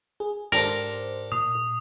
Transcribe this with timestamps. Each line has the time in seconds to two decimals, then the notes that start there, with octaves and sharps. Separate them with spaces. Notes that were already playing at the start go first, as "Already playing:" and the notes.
0.20 G#4
0.52 G#2 D4 G4 A4 A#4 C5
1.32 A#2 D#6